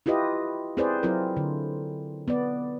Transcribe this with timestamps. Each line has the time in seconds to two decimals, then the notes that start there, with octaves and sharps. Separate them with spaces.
0.06 E4 F4 G4 B4 D#5
0.77 C4 E4 G#4 B4 C5 D5
1.03 F#3 C4 E4 F4 A#4
1.37 D3
2.28 B3 D5